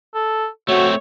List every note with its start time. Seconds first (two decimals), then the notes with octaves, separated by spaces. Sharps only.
0.14 A4
0.68 A3 C4 F#4 C#5